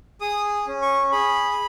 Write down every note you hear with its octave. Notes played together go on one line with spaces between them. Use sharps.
G#4 D#6
C#4
C#6
G#4 B5